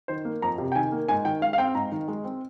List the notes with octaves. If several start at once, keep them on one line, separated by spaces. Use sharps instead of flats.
D#3 C5
A#3
F2 A#5
C3
G5
D#3 G#5
A#3
G#2 G#5
D#3 G5
G#3 F5
F5
C4 G5
G#2 A#5
D#3
G#3
C4